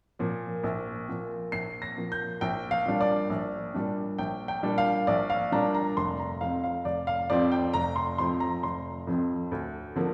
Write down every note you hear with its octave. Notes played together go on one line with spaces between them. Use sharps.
A#2 F3 A#3
A#1
A#2 F3 A#3
A#1 C7
A#6
A#2 F3 A#3
G6
A#1 G5
F5
A#2 G3 D4
D5
A#1
A#2 G3 D4
A#1 G5
G5
A#2 G3 D4
F5
A#1 D5
F5
A#2 G3 D4 A#5
A#5
F1 C6
A#5
F2 F3 C4 F5
F5
F1 D5
F5
F2 F3 C4 D5
G5
F1 A#5
C6
F2 F3 C4 C6
A#5
F1 C6
F2 F3 C4
D2
D3 F3 A#3